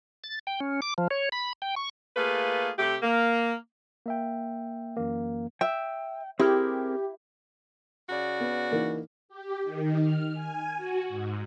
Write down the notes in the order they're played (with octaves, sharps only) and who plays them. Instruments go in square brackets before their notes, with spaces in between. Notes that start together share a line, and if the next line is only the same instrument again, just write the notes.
[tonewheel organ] A6
G5
C#4
D6
F3
C#5
B5
G5
C#6
[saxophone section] A3 A#3 F4 G#4 B4
C3 A3 G4
A#3
[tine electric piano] A#3 E5 G5
F#2 E3 A#3
[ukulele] E5 [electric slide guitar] G5
[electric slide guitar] C4 G#4 A#4 [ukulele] E4 [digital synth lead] G4
[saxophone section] C#3 F#4 D5
[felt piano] B3
E3 A#3 D#4
[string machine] G4
D#3
F6
G#5
F#4
G#2